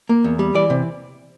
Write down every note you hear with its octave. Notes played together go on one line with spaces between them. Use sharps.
A#3
E2
G3
E3 D5
C3